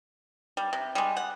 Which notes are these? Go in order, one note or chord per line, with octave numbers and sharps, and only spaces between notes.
G3
C3
G3 G#3
F#5